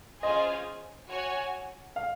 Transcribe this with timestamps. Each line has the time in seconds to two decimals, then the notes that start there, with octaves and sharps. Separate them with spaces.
0.23 C#4 F4 G#4 C5 D#5
1.10 F#4 C#5 G#5
1.96 F5